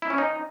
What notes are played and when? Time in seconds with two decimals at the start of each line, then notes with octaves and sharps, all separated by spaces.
0.02 E4
0.10 C#4
0.18 D#4